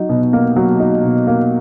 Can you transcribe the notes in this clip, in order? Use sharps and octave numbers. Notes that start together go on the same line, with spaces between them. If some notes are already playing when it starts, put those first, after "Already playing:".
Already playing: F#3 D#4
B2
A#3
F#3
D#4
B2
A#3